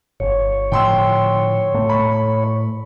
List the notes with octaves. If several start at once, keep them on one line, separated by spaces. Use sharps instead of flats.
G1 C#5
A2 D3 F3 G5 C6 E6
A2 A3
B5 C#6